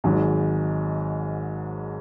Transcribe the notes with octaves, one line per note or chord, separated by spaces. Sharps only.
G#1 G#2 F#3